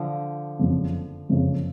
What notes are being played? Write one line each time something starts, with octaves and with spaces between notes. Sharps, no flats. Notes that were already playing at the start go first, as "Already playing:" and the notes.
Already playing: D3 F3
F#1 F2 C#3
F#1 F2 C#3